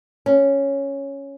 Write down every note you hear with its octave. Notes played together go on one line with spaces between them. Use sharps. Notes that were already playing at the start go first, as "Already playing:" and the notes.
C#4